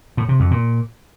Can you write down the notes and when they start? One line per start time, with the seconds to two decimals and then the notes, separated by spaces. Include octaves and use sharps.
0.17 A2
0.29 C3
0.40 F2
0.51 A#2